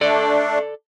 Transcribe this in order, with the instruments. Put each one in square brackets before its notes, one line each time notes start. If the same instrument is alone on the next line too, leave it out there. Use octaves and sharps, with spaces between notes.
[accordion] A3 D4 [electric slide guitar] A4 D5